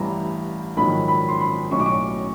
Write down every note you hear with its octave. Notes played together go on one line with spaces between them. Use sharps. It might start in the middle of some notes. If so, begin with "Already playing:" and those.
Already playing: A1 G2 E3 G3 A#5
A#1 G#2 D#3 F#3 B5
B5
C6
B5
B1 A2 F#3 C#6
D6
C#6